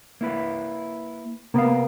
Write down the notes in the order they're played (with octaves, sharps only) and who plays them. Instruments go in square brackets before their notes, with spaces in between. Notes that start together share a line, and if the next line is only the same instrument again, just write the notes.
[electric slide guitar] A#3 E4 B4
[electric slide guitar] C3 F5 [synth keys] A#3 B3